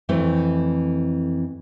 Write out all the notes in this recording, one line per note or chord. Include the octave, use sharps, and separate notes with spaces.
F2 E3 A3 C4